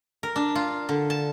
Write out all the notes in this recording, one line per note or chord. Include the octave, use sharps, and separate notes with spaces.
A#4
D4
F4
D3
A5